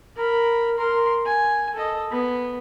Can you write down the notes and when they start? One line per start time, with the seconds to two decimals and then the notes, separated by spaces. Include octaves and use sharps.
0.16 A#4 B5
0.78 A#4 C6
1.26 G#5
1.74 A4 D#5
2.11 B3